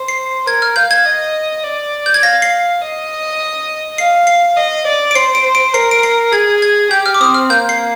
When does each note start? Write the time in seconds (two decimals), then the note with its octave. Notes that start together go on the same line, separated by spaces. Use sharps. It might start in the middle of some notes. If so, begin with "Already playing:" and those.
Already playing: C5
0.08 C7
0.47 A#4 G#6
0.62 F6
0.76 F5 G6
0.91 G#6
1.05 D#5
1.64 D5
2.06 G6
2.14 G#6
2.23 F5 A#6
2.42 C7
2.82 D#5
3.98 F5 C7
4.27 C7
4.57 D#5
4.86 D5
5.11 D7
5.15 C5 C7
5.35 D7
5.55 D7
5.74 A#4 C7
5.91 D7
6.03 C7
6.32 G#4 G#6
6.62 G#6
6.91 G4 G6
7.06 F6
7.14 D6
7.20 C4 D#6
7.34 F6
7.50 A#3 G6
7.69 C7